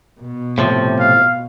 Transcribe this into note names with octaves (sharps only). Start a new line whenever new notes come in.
B2
A2 C3 F3
F5